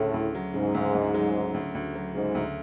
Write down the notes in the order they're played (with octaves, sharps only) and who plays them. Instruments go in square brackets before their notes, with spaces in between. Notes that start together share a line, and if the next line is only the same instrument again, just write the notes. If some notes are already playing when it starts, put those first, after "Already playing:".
Already playing: [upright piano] D2 C#3 [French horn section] A2
[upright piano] D2
F#3
[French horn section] G#2 [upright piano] C#3
[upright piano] D2
D2
F#3
C#3
D2
D2
F#3
[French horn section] G#2 [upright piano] C#3
[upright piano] D2